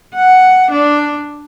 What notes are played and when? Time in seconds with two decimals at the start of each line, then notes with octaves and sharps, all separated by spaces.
0.16 F#5
0.71 D4